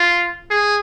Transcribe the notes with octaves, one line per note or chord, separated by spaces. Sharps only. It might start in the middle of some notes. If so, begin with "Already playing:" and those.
Already playing: F4
G#4